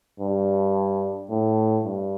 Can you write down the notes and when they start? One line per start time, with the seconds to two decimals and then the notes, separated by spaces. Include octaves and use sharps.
0.19 G2
1.30 A2
1.84 G2